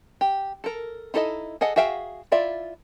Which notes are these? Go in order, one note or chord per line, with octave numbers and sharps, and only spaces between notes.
G4
A4 A#4
D#4 E4 A4 D5 D#5
G#4 A4 D#5 F#5
F#4 G#4 E5 F5 G5
E4 F4 D5 E5